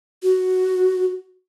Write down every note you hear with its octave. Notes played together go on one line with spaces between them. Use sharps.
F#4